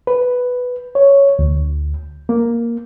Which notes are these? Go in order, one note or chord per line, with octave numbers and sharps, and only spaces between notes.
B4
C#5
D2
A#3